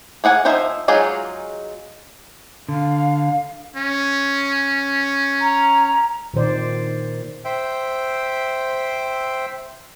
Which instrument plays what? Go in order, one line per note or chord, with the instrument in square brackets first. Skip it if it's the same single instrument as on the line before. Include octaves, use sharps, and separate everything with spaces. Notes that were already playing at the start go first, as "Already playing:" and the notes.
[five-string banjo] A#3 G#4 F#5 G#5
F3 D#4 C5 E5 G#5
F#3 G#3 D#4 F4 G#4
[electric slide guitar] D3 [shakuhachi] F5
[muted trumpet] C#4
[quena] A#5
[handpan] A#2 D#3 C5 D5
[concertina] C5 E5 G5